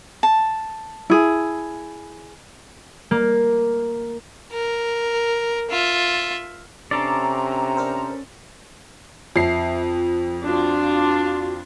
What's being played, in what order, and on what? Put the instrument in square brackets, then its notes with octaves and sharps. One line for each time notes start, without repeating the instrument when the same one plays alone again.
[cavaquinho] A5
[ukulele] E4 G#4
[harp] A#3
[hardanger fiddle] A#4
F4 E5
[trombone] C3 [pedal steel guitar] C#4 A4 D5 [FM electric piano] D4 C6 D6 [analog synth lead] A#5
[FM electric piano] D4 A#4 C5
[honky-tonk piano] F2 C7 [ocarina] E5
[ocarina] F4
[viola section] D4 F4 [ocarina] F#4